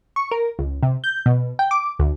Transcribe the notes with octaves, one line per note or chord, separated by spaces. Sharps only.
C#6
A#4
C#2
C3
G6
B2
G5
D6
D2